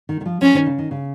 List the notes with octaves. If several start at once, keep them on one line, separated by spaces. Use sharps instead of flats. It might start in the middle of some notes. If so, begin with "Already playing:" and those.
D#3
D#3
F3
F3 C#4
D#3
C#3
D#3
C#3